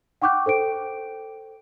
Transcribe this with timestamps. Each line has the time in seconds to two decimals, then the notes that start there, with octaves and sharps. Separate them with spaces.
0.22 F#5 G5 C#6 D6 F#6 G6
0.46 A4 C5 G5 D7